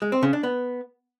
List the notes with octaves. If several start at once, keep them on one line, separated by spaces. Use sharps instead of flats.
G#3
C4
C#3
D4
B3